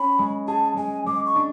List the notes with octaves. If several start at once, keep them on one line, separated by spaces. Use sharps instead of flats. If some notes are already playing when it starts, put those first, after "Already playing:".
Already playing: C#4 B5
G#3
G#4 A5
G#3 G#5
G#3 D6
C#6
D4